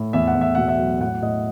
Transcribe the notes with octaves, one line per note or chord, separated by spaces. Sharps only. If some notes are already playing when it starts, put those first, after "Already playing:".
Already playing: A2
E2 E5
F#5
E2
E5
B2 F#5
E5
F#3
A2 F#5
A2 D#5